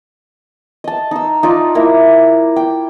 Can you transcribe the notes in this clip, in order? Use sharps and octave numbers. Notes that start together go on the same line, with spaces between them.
D#5 A5
D#4 E6
D#4 F4 D5
A#3 E4 A#4
G5